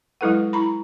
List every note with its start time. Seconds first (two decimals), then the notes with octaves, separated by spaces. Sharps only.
0.21 F#3 G#3 E4 A4 B4 F#5
0.53 E4 A#5 B5